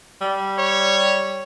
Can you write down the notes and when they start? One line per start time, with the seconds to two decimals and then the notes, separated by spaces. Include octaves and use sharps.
0.21 G3
0.59 C#5